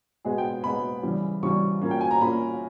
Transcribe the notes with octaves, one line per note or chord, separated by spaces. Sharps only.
B2 G#3 B3 G#4
G5
B2 G#3 B3 B5
C#3 E3 G3
C#3 E3 G3 C#6
A#2 A#3 C#4
G5
G#5
A#5
A#2 A#3 C#4 B5